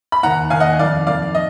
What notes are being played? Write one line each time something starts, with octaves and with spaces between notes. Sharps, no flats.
B5
D#2 D#3 F#5 A#5
D#2 D#3 F5 G#5
D#5 F#5
F2 D#3 D5 F5
F2 D#3 D5 F5
D#5